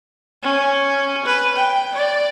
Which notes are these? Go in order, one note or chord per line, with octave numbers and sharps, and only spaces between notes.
C#4
B4
G5
D5